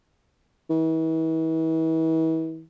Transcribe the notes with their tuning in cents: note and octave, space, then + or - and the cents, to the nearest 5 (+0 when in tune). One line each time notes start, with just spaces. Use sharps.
E3 -40